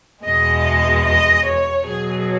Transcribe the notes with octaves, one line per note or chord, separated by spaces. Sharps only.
E2 B2 G#3 D#5
D#5
D#5
C#5
B2 F#3 G#4